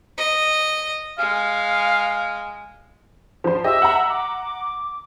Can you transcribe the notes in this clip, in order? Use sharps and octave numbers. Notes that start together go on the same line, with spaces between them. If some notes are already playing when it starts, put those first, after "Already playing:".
D#5
G#3 F5
F3 C5
G4 D#5 E5 G5
F#5 A#5
D6